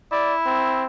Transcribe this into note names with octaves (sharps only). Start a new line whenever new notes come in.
E4 D5
C4